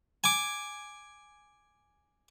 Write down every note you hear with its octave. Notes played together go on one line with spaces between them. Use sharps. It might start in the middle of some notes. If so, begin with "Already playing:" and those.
G#5 D6